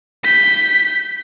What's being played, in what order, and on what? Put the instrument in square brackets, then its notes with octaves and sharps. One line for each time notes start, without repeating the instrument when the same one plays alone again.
[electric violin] G6 B6